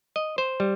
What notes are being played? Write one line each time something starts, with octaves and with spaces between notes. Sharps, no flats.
D#5
C5
G3